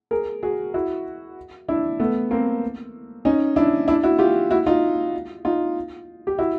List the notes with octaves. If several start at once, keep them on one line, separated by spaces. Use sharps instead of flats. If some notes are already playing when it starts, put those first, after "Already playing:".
G#4 A#4
F#4 G#4
E4 F#4
D4 E4
A3 B3
A#3 C4
C#4 D#4
D4 E4
D4 E4
E4 F#4
F4 G4
E4 F#4
D#4 F4
D#4 F4
G4
E4 F#4